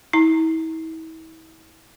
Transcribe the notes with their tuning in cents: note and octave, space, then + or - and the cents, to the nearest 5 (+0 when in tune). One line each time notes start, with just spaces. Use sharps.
E4 -40 A#5 -20